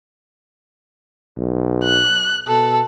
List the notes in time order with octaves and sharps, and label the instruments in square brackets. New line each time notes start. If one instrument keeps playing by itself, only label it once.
[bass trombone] B1
[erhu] F#6
[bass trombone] B2 [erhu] A4